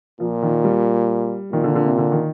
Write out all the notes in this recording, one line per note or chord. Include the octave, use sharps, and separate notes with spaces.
A#2 F3
D#3
G3
A#2 D#3
D3
D3
C3
D3
D#3